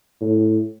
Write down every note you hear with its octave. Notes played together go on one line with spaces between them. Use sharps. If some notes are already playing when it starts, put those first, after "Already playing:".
A2